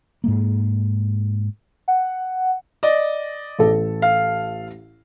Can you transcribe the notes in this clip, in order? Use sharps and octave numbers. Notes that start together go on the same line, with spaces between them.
G#2 G#3 A#3
F#5
D5 D#5
A1 A4
F5